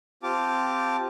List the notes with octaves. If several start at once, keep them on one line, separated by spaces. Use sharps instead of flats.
C4 F4 G4 A5 D6